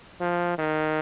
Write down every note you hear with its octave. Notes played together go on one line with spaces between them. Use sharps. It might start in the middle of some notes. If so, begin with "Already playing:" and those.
F3
D#3